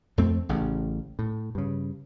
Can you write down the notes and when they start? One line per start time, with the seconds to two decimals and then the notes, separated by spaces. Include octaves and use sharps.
0.18 F2 A3 C4
0.49 A1 A2 C#3
1.19 A2
1.55 G2 C#3